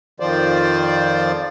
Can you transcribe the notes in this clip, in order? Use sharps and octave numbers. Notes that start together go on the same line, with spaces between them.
F2 D#3 F3 F4 C5 D5